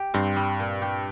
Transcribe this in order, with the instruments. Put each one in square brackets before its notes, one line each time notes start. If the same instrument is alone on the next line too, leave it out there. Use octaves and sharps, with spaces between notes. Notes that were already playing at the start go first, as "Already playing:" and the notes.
Already playing: [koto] G4
[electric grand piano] G2 [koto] C4
[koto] G3
A#2
G4